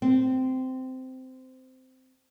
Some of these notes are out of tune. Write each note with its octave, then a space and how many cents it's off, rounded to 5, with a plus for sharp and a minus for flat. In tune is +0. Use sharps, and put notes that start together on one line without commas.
C4 -15